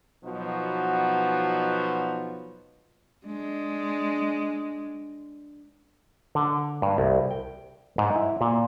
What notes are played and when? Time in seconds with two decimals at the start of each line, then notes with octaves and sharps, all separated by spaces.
0.24 B2 F3 F#3 B3 D#4 F#4
3.26 G#3 D4
6.35 D3
6.82 G2
6.98 C2
7.31 G5
7.98 G#2
8.16 E4
8.41 A#2